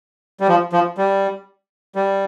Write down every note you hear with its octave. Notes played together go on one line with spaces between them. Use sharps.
G3
F3
F3
G3
G3